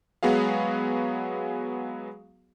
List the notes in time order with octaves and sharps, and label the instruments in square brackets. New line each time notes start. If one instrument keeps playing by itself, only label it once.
[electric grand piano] F#3 G#3 B3 F#4 G#4 F5